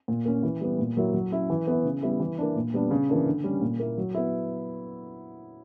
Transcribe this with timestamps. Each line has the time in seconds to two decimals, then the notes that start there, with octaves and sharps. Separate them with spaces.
0.08 A#2
0.25 A#3 C#4
0.43 E3
0.61 G3 B3
0.79 A#2
0.97 F#3 A#3 E4
1.14 F#3
1.32 C#4 E4
1.50 E3
1.67 B3 E4
1.85 C#3
2.03 G3 B3 E4
2.20 E3
2.39 A#3 D4
2.56 A#2
2.74 G3 B3 D4
2.91 C#3
3.09 E3 A#3 D4
3.26 D3
3.44 G3 C#4
3.61 A#2
3.79 A#3 E4
3.98 F#3
4.15 B3 E4